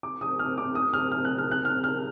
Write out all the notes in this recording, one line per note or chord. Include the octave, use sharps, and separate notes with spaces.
D6
D#6
F6
D6
D#6
F6
F6
F#6
F6
F#6
F6
F6